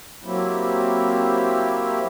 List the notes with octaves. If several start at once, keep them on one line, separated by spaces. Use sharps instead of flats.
F#3 A#3 C4 E4 G4